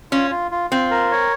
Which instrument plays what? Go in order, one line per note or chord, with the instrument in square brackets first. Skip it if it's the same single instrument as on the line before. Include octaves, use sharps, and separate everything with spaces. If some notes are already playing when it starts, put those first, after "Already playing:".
[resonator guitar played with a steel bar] C#4 [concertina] F4
[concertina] F4
F4
[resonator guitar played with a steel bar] C4 [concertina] F4
[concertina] A#4
C#5